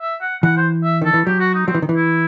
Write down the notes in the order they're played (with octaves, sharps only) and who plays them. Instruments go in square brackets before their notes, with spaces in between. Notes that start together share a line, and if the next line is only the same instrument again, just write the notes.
[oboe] E5
F#5
[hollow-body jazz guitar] E3 [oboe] F#5
[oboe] C5
E5
[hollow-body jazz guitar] D#3 [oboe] A4
[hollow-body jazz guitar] E3
[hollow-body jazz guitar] F#3 [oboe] G4
[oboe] F#4
D#4
[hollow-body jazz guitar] F#3 [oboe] C4
[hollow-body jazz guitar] E3
D#3
E3
[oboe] E4